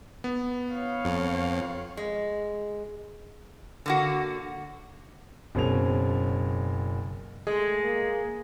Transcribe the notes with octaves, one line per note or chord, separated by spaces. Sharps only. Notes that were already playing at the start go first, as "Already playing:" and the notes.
B3
C#5 F5
F2
G#3
D3 A#3 F#4
F#1 B2 C4 C#4 G#4 F7
G#3 A3 G#4
A#3